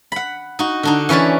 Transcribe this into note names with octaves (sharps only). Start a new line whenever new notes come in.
F#5 B5
D#4 F#4
D3 D4 D#4
E3 C#4 B4 C#5 D5